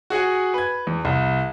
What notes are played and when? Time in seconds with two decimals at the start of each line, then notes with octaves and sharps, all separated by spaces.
0.10 F#4 G#4 F#5 G#5
0.54 B4 G#6
0.87 E2
1.05 C2